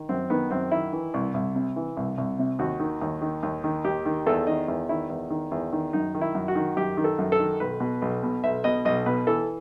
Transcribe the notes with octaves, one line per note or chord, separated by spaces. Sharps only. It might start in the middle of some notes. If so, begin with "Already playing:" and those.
Already playing: D#3
F#2 C4
D#3 B3
F#2 C4
D#3 E4
E3
C2
C2
C3
E3
C2
C2
C3
D#2 F#4
D#3
D#2
D#3
D#2
D#3
D#2 G4
D#3
E2 A4
D#3 D#5
E2
D#3 E4
E2
D#3
E2
D#3
F#2 D#4
D#3
E4
F#2
F#4
D#3
F#2 G4
D#3
A4
F#2
A4
D#3
B1 B4
B2
B1
B2
B1 E5
B2 D#5
B1 D#5
B2 B4
E3 A4